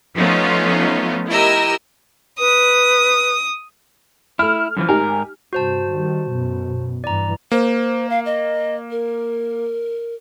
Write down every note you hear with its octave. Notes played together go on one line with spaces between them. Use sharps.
F3 A3 B3 C#4 D#4 F4
E4 G4 A#4 D#5 E6
B4 D#6
A3 E4 F6
F#2 E3 F3
G#2 D#4 G4 A#4 G#5
G2 C3 F#4 C5 A5
D#3 G3
F#2 B2
G2 E3 D5 A#5
A#3 C5
F5
D#5
A#4